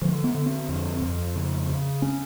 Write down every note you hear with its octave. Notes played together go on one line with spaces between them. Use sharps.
D3 F3
B3
D3
C4
F2
F2
C#3
C#3
C#4